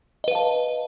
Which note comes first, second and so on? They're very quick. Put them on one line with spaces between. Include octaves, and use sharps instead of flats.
D#5 B4 F5 A5